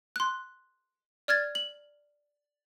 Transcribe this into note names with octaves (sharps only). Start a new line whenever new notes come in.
C6 F#6
D5 F6 G#6 A6
F#7